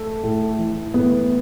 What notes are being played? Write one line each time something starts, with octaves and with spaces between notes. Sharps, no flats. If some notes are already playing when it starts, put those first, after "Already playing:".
Already playing: A3
A2
E3
A2 B3